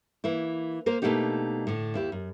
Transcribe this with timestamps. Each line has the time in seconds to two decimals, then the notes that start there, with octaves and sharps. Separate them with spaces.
0.24 E3 A#3 E4
0.86 A#3 A#4 C5
1.02 B2 A3 A#3 D4 D#4 G4
1.67 A2 D3
1.94 D#2 E4 G4
2.12 F#2